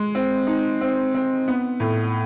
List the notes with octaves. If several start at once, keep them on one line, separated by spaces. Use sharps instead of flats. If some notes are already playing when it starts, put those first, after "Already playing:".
Already playing: G#3
C4
D#4
C4
C4
B3
A2